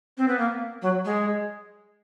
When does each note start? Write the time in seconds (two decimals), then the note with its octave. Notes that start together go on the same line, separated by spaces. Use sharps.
0.18 C4
0.28 B3
0.39 A#3
0.82 F#3
1.05 G#3